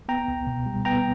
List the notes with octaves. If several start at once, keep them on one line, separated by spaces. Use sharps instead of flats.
B3 G5 A#5
C#2
B2
G3
B3 G5 A#5